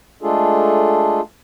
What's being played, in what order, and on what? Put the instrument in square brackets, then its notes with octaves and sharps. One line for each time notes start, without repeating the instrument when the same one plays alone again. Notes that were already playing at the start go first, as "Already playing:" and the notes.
[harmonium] G#3 A3 D4 F4 G#4 A4